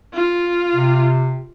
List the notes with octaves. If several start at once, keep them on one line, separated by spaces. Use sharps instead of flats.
F4
C3